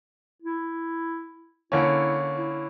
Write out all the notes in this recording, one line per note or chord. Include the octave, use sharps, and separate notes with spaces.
E4
D3 A#3 C#4 E4
E4